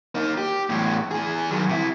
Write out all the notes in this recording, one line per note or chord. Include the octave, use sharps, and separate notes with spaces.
A#3 D#4
G4
E2 A2
E3 G#4
D#3 F#3
C3 E4